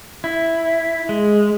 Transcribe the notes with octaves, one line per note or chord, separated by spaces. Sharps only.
E4
G#3